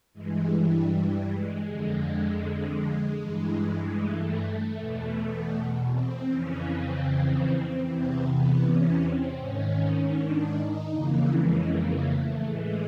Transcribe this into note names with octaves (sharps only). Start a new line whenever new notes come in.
G2 E3 G#3
G3
G3
G#3
F2 D3 G#3
G2 E3
A3
E2 B2
C4
F2 C#3 E3 C#4
C4
E2 C3 E3 C4
B3
C#4
C4
G#2 D#3 C#4
D4
D#4
F2 C#3 E3 A#3
G#3
A#3
A3
A2 E3 G#3